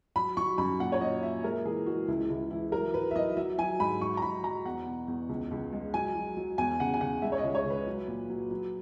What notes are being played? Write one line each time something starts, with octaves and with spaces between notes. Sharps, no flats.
F#3 B5
F#3 C#6
F#2 B5
A#2 F#5
C#5
F#3 D#5
A#2 E5
G#3 A#4
E3 G#4
G#3 F#4
C#2 E4
C#2 E4
E3 E4
F#3 A#4
F#3 B4
E5
F#3 D#5
F#3 E5
F#3 G#5
G#2 B5
F#3 C#6
A#5
F#3 B5
F#3 A#5
E2 F#5
B2
E2
C#2
C#2
G#3
F#3 G#5
F#3
F#3
E2 G#5
C#3 F#5
G#5
C#3 F#5
G#3 E5
C#5
D#5
C#2
C#5
C#3
B4
F#3
A#2
F#3
F#3